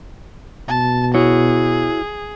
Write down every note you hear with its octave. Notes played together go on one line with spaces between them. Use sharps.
B2 A5
E4 F#4 G#4 C#5